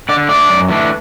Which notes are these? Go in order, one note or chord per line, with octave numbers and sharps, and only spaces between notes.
D3 D5
A3 D4 D5
F#2
E3 A3 D4